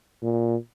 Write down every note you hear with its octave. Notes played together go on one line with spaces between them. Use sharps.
A#2